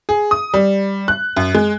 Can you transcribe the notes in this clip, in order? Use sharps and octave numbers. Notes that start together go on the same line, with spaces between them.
G#4
D#6
G3
F#6
F#2
G#3